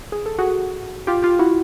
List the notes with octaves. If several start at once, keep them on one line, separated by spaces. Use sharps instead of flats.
G#4
A4
F#4 G#4
F4 G4
F4 G4
E4 F#4